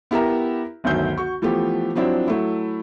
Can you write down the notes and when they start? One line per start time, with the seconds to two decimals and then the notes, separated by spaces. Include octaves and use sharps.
0.11 B3 E4 G4 A#4 E5 A#5
0.84 G1 D2 D#3 F#3 G6
1.18 F#4 C#6
1.42 E3 F3 A3 B3 G4
1.95 F3 F#3 C4 D4 E4
2.28 F#3 A3 E4